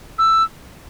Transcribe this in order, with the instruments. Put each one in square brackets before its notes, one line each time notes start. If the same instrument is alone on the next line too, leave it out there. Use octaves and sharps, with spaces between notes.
[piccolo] E6